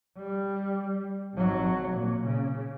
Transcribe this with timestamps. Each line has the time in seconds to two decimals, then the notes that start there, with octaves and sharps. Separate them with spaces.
0.17 G3
1.36 G#1 F#3
1.91 A#2
2.26 C#3